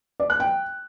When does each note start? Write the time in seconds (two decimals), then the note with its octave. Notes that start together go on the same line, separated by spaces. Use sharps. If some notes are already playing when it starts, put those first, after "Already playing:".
0.20 D5
0.30 F#6
0.40 G5